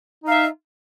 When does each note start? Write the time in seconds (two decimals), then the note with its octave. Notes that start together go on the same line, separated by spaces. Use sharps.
0.24 D#4
0.28 F5
0.31 E5